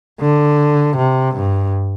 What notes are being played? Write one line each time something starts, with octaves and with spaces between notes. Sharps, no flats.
D3
C3
G2